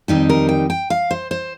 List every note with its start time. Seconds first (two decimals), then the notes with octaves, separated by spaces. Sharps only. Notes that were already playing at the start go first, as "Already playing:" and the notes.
0.08 F2 D#3 G3 D#4 G4
0.29 A#4
0.49 G5
0.70 G5
0.90 F5
1.11 C5
1.31 C5